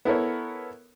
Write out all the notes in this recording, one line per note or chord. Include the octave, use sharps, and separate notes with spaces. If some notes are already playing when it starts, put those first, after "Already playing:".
B3 E4 A4 A#4 C#5